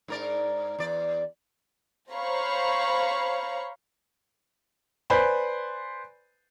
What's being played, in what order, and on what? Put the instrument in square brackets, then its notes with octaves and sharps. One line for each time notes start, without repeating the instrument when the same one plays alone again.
[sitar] G#2 A#4 D5
E2 D5
[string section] C5 C#5 F5 A#5 B5 C#6
[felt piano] B4 C5 D5 G#5 B5 C6